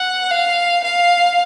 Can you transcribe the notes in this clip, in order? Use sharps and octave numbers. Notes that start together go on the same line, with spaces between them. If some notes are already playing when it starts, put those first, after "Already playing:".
Already playing: F#5
F5
F5